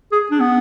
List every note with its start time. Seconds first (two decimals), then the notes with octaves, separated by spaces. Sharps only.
0.12 G#4
0.31 D4
0.40 B3